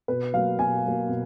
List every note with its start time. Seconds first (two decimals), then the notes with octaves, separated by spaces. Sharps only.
0.08 B2 B4
0.33 F#3 A#3 F5
0.59 B2 G#5
0.84 F#3 A#3
1.09 B2